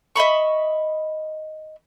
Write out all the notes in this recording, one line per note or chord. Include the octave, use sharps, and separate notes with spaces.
D#5 E5 B5 C#6